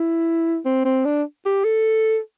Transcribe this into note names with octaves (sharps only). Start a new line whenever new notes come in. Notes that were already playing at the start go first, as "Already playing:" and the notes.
Already playing: E4
C4
C4
D4
G4
A4